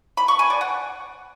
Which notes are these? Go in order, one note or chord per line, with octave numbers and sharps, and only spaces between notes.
B5
C#6
G#5
D5
F#5